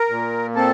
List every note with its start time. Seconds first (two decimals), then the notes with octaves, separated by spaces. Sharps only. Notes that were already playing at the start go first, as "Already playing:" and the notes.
Already playing: A#4
0.10 A#2
0.56 C4 A4